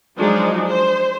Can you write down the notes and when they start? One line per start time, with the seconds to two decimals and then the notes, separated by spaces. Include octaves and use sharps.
0.17 F3 F#3 G#3 D4 D#4
0.68 C5